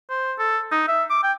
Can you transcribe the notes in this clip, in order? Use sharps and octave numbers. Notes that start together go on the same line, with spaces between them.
C5
A4
D#4
E5
D6
G5